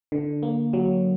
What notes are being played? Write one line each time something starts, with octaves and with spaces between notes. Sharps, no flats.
D3
A#3
F#3